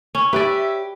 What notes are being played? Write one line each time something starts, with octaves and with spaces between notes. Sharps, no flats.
C#4
G4 B4 C#5 D5 E5